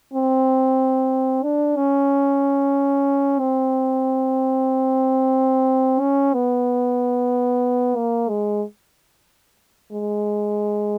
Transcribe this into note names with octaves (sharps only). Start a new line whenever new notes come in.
C4
D4
C#4
C4
C#4
B3
A#3
G#3
G#3